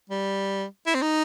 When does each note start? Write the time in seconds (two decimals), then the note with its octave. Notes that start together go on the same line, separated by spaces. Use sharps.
0.09 G3
0.87 E4
0.95 C4
1.02 D#4